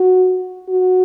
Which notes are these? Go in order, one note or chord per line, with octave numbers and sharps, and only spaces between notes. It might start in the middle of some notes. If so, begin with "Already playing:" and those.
Already playing: F#4
F#4